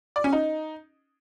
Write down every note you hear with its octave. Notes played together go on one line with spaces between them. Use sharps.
D5
C#4
D#4